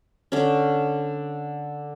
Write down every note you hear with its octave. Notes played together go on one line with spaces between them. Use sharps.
D3 C#4